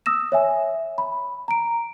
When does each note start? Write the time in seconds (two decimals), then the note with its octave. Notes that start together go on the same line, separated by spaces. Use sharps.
0.06 D#6 E6 A#6 E7
0.32 C#5 E5 G#5
0.98 B5
1.48 A#5 D7